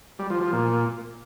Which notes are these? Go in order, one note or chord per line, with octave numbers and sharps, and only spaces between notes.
G3
F3
F3
A#2